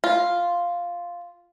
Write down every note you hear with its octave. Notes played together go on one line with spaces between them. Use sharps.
F4